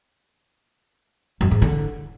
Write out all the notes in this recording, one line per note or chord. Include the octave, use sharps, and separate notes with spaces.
F#2
G#2
D3